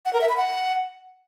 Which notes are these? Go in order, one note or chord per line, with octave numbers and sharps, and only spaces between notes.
F#5
A#4
E5
B5
F#5